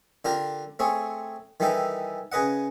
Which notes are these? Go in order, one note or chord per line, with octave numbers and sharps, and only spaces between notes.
D3 D4 F4 G4 A#4
A3 C4 G#4 C#5
D#3 E3 G3 D#4 E4 A4
C#3 G#4 B4 D#5 F#5